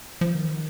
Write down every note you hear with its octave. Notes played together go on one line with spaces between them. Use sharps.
F3
D#3